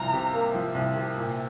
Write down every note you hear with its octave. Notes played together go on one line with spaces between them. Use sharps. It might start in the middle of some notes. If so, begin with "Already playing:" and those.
Already playing: C2 F3 A#5
C3
A#3
F3
C2
C3
A#2